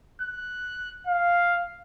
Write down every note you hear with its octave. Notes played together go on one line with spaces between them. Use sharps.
F#6
F5